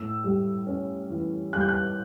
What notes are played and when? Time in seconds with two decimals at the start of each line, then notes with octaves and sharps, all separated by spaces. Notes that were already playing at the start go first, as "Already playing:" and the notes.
Already playing: A2 E6
0.24 G3
0.67 C#4
1.10 E3
1.53 G3 F#6
1.61 G6
1.69 F#6